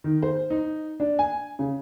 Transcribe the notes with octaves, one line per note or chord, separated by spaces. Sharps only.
D#3
C5
D#4
D4
G#5
C#3